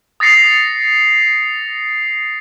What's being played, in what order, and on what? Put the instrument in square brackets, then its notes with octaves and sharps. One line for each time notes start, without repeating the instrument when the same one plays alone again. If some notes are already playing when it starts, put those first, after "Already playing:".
[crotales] D#6 A6 A#6 C7 C#7 F7